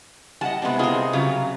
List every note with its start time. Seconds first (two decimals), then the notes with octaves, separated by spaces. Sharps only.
0.41 G3 D#5 F#5 A5
0.62 C3 G#3 B3 D4
0.79 F4 G#4 A#4 D#5 A5
1.13 C#3 F#3 G3 F4